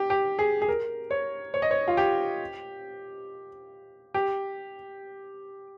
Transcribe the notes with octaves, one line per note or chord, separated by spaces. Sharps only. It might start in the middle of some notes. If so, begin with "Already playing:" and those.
Already playing: G4
G4
G#4
G#4
A#4
C#5
C#5
D#5
C#5
F4
G4
G4